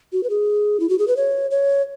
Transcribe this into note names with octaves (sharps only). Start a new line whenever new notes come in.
F#4
B4
G#4
E4
F#4
G#4
B4
C#5
C#5